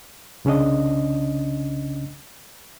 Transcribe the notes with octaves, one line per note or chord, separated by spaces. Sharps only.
C2 C#3 C#4 D4 D#5